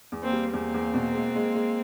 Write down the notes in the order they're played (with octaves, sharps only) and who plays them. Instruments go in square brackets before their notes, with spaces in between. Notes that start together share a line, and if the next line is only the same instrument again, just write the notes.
[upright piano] E2
[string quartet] A#3 C4
[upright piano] G3
[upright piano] E2 [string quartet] A#3 C4
[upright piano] E2
B2
G#3
G#3
G#3